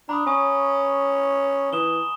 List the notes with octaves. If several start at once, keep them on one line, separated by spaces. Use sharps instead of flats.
D4 A#5 B5 D#6
C#4 G#5 C#6 D#6
E3 D#6 E7 G7